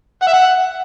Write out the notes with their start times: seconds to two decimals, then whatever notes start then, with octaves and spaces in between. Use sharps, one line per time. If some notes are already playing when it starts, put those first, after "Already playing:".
0.22 F#5
0.27 E5
0.33 F#5